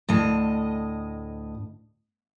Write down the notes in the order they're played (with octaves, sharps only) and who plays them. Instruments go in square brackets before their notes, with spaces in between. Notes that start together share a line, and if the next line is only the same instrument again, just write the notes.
[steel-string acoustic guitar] D2 A2 D#5